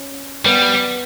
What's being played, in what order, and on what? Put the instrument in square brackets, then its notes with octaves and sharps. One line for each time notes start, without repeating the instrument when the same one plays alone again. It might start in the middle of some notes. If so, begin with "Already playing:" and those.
Already playing: [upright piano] C#4
[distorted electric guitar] G3 [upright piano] B3